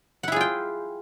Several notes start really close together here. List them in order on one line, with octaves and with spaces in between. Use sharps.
F#5 E4 G#4 F4 G5